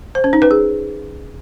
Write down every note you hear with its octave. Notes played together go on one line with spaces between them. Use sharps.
C5
C#4
D#4
B4
G#4